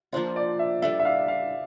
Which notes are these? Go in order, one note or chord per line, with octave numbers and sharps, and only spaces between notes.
F3 A#3 D4 F4 C5
D5
E5
G3 D4 A4 E5
E5
F5
F5